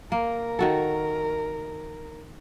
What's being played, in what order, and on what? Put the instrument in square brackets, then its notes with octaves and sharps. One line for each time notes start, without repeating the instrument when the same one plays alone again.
[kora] A#3 [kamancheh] A#4
[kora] D#3 F#4 A4